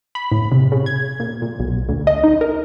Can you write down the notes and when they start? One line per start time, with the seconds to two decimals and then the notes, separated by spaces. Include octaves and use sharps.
0.15 B5
0.32 A2
0.52 C3
0.72 C#3
0.86 G#6
1.20 A#2
1.42 A#2
1.59 B1
1.89 D2
2.07 D#5
2.24 D#4
2.41 A#4